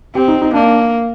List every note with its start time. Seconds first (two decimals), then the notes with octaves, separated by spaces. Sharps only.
0.15 C4 G4
0.28 D#4
0.42 D#4
0.54 A#3 D4